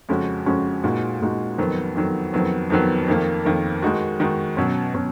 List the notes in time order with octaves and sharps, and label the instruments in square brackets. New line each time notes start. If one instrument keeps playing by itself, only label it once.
[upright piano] F2 C#3 G#3 C#4 F#4
F2 C#3 G#3 C#4 F#4
A#2 G#3 D#4 F#4
A#2 G#3 D#4 F#4
F2 D#3 F#3 B3
F2 D#3 F#3 B3
F2 D#3 F#3 B3
F2 D#3 F#3 B3
F2 D#3 A#3
F2 D#3 A#3
D#3 G#3 D#4 F#4
D#3 G#3 D#4 F#4
B2 F#3 C#4
B2 F#3 C#4